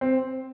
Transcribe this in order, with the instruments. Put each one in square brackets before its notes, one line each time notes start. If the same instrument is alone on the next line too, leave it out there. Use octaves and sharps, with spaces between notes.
[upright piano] C4